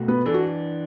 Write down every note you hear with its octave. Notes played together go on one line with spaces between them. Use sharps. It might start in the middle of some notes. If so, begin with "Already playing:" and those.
Already playing: B2 A3 F#4
B3 B4
E3 D4 A4
F#4